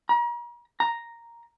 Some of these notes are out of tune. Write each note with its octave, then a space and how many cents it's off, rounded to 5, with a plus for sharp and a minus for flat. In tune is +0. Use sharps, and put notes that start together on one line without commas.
A#5 +40
A#5 +0